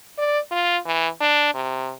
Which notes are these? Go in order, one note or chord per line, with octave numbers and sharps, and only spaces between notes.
D5
F4
E3
D4
C3